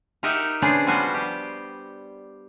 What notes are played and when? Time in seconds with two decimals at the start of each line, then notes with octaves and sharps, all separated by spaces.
0.23 D#4 G4 A#4 D#5 E5 F#5
0.62 C#3 B3 D4 G#4 C5 D5
0.87 F3 G3 B3 F#4 C5 G#5
1.14 G4